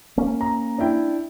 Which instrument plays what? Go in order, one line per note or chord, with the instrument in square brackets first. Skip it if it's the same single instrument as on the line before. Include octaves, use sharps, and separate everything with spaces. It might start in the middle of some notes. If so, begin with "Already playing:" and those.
[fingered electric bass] A#3 C#4
[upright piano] A#5
D4 E4 G5